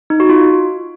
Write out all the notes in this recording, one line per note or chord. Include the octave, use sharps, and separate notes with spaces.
D#4
F#4
F4